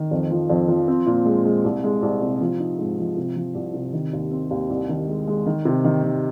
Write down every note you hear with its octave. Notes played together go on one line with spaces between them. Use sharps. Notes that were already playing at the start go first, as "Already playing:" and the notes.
Already playing: D#3
F2
F3
F2
F3
C4
A#2
G#3
G#3
C2
G#3
C2
C3
F3
D#4
G#2
F3
C3
F3
C2
C3
D#3
D#2
C4
D#2
C2
D#3
G#3
G#3
D#3
C3
D#3
D#3